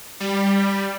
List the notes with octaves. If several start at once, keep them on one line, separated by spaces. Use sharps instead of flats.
G3